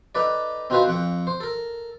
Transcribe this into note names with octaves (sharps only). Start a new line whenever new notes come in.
D#4 A4 B4 D5
C4 D#4 F4 F#4 B4 C5
F2 F#5 G5
C5
A4 A#4